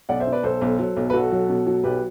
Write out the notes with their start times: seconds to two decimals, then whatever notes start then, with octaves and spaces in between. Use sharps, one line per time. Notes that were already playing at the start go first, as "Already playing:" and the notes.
0.09 B1 D5 F#5
0.20 C5 E5
0.27 B2
0.32 B4 D5
0.43 B1 A4 C5
0.61 B1
0.79 F#3
0.97 B1
1.10 B4
1.13 B1 F#4 A4
1.32 F#3
1.49 B2
1.66 F#3
1.84 B1 G4 B4